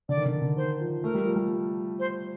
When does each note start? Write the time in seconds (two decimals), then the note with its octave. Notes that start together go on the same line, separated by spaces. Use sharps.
0.09 D3 D5
0.17 D#3
0.26 D3
0.34 D#3
0.42 D3
0.57 D#3 C5
0.80 F3
1.03 A3 A#4
1.15 G3
1.25 F3
1.36 G3
1.99 C5